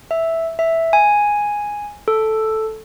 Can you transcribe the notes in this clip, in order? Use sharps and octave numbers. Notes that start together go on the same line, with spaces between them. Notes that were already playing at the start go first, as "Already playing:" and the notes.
E5
E5
G#5
A4